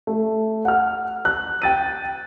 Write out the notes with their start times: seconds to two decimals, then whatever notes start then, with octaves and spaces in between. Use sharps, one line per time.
0.07 A3
0.65 F#5 F6
1.25 F#6
1.62 G5 A6 D#7